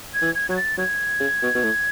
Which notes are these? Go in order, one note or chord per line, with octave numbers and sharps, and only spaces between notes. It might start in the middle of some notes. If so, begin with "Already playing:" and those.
G#6
E3
G#6
F#3 G#6
A6
F#3 G#6
C#3
B2
B2
A2